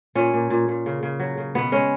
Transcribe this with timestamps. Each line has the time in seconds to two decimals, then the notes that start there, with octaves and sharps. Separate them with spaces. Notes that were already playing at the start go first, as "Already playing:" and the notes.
0.15 A#2 C#4
0.34 A#2
0.50 A#2
0.68 A#2
0.86 C#3
1.03 C#3
1.20 F#3
1.37 C#3
1.55 B2 B3
1.72 G#3 C#4